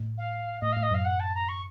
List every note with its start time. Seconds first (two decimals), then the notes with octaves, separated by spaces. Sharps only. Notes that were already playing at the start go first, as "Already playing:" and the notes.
Already playing: A2
0.18 F5
0.61 A2 D#5
0.72 A2 F5
0.83 D#5
0.91 F#2 F5
1.05 F#5
1.20 A5
1.35 A#5
1.49 C#6